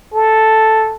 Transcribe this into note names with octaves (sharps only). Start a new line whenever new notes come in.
A4